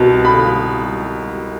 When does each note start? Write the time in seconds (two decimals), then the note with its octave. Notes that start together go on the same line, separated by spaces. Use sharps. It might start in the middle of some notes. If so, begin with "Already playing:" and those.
Already playing: C2 B2
0.25 B5